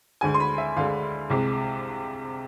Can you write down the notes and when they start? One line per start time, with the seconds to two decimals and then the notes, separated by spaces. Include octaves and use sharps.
0.21 D2 D3 G#3 G#5
0.34 C6
0.40 B5
0.58 E5
0.77 D2 D3 G#3 F5
1.30 C2 C3 G#3